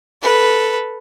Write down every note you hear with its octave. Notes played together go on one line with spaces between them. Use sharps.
A4 B4